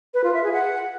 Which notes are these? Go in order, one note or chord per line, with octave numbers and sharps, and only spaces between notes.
B4
F4
E5
G#4
F#5